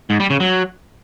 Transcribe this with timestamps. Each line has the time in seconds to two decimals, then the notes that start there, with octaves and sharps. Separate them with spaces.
0.10 G#2
0.20 G3
0.30 C#3
0.40 F#3